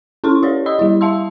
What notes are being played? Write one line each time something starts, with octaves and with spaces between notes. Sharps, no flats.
C#4 E4 A4 C6 C#6
G4 C#5 D5
D#5 B5 D#6 E6
G3 E4
E5 F5 A5 C6 E6